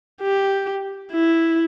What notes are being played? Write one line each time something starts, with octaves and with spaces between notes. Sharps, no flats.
G4
E4